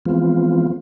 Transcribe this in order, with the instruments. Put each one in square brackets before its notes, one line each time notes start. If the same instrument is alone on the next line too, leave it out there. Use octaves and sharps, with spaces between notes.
[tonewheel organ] E3 F3 G#3 B3 C4 F4